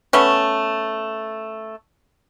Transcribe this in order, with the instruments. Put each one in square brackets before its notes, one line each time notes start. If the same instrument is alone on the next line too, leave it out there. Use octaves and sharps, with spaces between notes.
[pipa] A3 B3 C#4